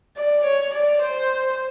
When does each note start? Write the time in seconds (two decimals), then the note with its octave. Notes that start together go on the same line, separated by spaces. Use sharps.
0.16 D5
0.45 C#5
0.74 D5
1.02 C5